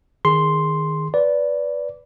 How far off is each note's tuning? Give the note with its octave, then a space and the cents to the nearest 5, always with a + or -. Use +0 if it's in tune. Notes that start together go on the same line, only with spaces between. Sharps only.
D#3 +0 G#4 +0 C6 +0
B4 +0 D5 -15